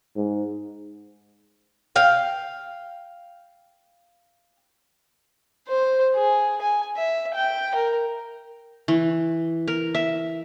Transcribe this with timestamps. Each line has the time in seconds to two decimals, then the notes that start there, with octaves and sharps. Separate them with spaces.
0.16 G#2
1.96 F5 G5
5.68 C5
6.15 G#4
6.61 G#5
6.96 E5
7.35 G5
7.75 A#4
8.88 E3
9.68 A#4
9.95 E5